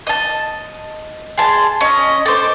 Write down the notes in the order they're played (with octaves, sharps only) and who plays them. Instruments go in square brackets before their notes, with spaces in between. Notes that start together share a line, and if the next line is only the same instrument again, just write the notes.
[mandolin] D#5 A5
[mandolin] G#4 A5 [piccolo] C6
[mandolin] C#4 [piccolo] D#5
[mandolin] A4 C5 [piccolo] D6